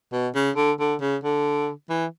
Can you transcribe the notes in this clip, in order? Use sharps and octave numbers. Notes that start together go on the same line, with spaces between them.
B2
C#3
D3
D3
C#3
D3
E3